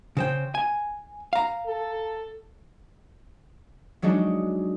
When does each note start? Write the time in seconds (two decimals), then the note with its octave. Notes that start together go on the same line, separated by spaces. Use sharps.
0.17 C#3 C5 G5
0.55 G#5
1.33 F5 A#5
1.66 A4
4.02 F#3 G#3 D4 D#4 F#4